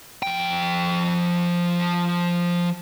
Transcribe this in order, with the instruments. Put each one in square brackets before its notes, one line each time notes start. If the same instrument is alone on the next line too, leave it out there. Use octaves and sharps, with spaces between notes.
[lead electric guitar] F3 G5